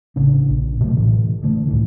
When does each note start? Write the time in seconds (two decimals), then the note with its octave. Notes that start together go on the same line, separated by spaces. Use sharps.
0.16 A1 C#3 D4
0.49 A#1
0.81 B2 D3 F#3 A3
0.97 A2 E3
1.43 D3 A3
1.68 D2 A2 D#3 E3